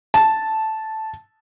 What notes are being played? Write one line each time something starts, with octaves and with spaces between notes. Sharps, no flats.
A5